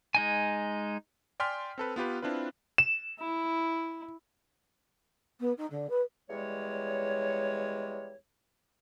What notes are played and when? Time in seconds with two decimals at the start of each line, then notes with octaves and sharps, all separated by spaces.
0.15 G#3 D#4 G#5
1.40 D5 G5 G#5 C6 F6 B6
1.78 C4 A4 B4
1.96 B3 F4 G4 B4
2.22 C4 D4 E4 F4 B4
2.78 E7
3.19 E4
5.40 B3
5.57 D#4
5.70 D3
5.89 B4
6.30 E2 G3 G#3 C#5